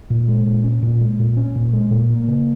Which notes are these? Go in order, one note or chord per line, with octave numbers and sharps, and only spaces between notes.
A#2
G#3
A#2
C#4
A#2
G#3
A#2
C#4
A#2
G#3
A#2
A#3
C#3